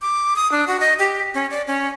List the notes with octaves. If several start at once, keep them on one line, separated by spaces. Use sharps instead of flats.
D6
D#6
D4
F#4
D#5
G4
C#4
D5
C#4